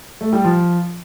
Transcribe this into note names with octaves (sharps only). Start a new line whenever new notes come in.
A3
G3
F3